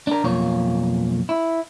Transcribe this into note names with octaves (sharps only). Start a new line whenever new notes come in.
D4 A#4
B1 F2 A#3 F4 C#5
E4